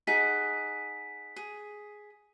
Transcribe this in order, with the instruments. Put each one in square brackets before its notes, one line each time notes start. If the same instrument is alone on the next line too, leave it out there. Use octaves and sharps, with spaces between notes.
[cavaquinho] D#4 G#4 F#5 [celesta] B6
[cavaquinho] G#4